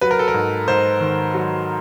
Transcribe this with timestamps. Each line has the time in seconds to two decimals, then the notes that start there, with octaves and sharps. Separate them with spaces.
0.01 F#3 B4
0.11 A#4
0.19 A4
0.28 A#4
0.34 G#2
0.68 G#2 C5
1.00 D#3
1.34 F#3